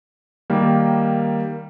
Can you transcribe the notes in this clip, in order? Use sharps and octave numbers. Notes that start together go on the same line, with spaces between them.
D#3 G3 A#3